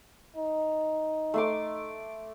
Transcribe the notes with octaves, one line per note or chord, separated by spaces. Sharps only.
D#4
A3 C6 D6